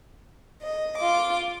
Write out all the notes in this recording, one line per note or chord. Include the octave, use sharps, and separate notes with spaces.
D#5
F4 D6